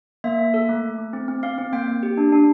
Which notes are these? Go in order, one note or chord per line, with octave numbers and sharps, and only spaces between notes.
A#3 E5
A#3
A4
A3
A3
A3
C4
C4
C4 F5
C4
A#3 G5
A#3
G4
D4
D4